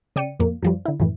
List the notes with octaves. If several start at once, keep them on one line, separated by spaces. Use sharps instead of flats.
C#3 D5 G5 C#7 D#7
F2 A#2 A#3
F#2 F3 G3
D3 E4
F#2 A2 E3